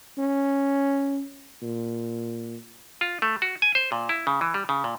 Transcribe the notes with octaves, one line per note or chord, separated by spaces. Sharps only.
C#4
A#2
F4
A3
F#4
G#5
C5
A#2
E4
C#3
E3
G3
C#3
A#2